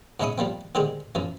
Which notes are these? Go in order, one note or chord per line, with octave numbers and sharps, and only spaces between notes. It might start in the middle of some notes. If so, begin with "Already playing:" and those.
G#2 C#3 G#3 E4 C#6 D#6
F3 G3 A#3 C4
D3 D#3 G#3 G4 G#4 C5
F#2 E3 F3